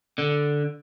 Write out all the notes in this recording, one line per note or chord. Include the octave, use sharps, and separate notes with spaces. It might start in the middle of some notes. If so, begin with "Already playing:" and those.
D3